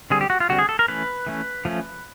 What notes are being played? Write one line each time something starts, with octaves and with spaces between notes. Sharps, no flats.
D3 G3 C4 G#4
G4
F#4
F4
D3 G3 C4 F#4
G#4
A4
A#4
E3 A3 C#4 B4
E3 A3 C#4
F3 A3 C#4